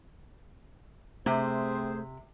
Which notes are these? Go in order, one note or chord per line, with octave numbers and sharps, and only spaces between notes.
C3 A3 C4 G#4 C5